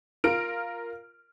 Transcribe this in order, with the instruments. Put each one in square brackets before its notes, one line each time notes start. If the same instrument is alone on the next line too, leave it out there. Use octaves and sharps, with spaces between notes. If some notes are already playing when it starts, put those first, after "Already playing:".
[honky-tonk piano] F4 A#4 F6 D7